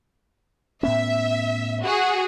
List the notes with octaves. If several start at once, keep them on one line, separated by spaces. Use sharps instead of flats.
A2 B3 C#4 E5
F#4 G#4